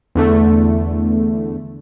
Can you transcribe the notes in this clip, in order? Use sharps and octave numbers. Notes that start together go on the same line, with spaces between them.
E2 D3 A3